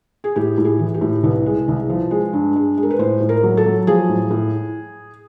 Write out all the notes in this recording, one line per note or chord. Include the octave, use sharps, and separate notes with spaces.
G#4
A2 G4
A2
G#4
E3
G4
A2
C2 B4
G#3
C2
F3
G#3
G2
G#3
G#3
A#4
B4
A2 C5
A2
A#4
F#3
A4
F#3
F3 G#4
A2
A2